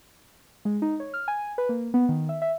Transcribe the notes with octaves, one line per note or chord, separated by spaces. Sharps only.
G#3
D#4
C#5
F6
G#5
B4
A#3
B3
D#3
E5
E5